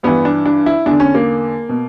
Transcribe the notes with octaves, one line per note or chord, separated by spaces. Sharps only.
G2 E3 B3
D4
D4
E4
E2 D3 D4
C#4
A#3
B2